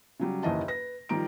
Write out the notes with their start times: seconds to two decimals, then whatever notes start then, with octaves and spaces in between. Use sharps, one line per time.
0.19 C#3 F#3 G3
0.43 F#1 D#2 E3 D#5 A5
0.68 B4 A#6
1.09 D#3 F3 G3 A#5 D7